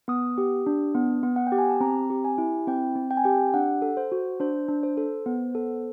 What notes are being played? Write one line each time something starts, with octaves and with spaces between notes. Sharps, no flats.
B3 D#6
G4
D4
B3
B3
F#5
G5
G4
G#5
A5
C4 A#5
G4
G#5
E4
C4 G5
C4
G5
G#5
G4 G5
D4 F#5
A4
C5
F#4
D4 C5
D4
C5
A4
B3
A4